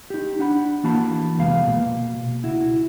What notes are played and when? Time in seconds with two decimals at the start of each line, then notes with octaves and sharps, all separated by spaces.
0.10 D#4 G4
0.39 D4 F#5 B5
0.84 E3 A#3 F#4 A5 B5
1.39 C2 F2 G#3 B3 F5
1.67 B2 A#3
2.43 C#2 E4 F#4